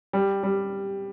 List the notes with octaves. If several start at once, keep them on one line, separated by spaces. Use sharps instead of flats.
G3
G3